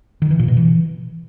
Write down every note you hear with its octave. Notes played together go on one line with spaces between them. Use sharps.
D#3
E3
A#2
B2
E3